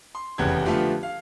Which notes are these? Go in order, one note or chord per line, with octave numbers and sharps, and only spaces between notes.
C6
F1 E2 C#3 B3 G4 G#6
D3 F3 A3 B3 F4 G4
F5